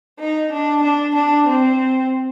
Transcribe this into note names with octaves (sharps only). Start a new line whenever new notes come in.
D#4
D4
D4
D4
C4